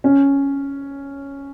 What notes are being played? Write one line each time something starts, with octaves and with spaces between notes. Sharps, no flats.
C#4